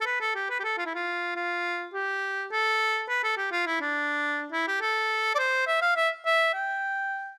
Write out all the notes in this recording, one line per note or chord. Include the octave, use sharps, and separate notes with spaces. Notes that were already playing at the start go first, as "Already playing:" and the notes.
A4
B4
A4
G4
B4
G4
A4
F4
E4
F4
F4
G4
A4
B4
A4
G4
F4
E4
D4
E4
G4
A4
D5
C5
E5
F5
E5
E5
G5